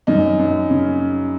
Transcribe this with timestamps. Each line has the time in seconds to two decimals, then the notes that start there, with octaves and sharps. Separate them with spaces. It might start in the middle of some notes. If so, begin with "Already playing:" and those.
0.07 F#2 D#4
0.39 F#2
0.70 C#3